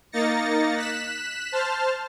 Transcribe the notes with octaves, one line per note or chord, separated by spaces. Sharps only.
A#3 D#4 A6 A#6 C#7
F#6 B6 E7
C5 A5 F6